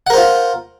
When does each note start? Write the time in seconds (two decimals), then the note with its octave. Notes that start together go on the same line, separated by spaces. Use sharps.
0.07 F#5
0.10 A#4
0.14 C5
0.17 F4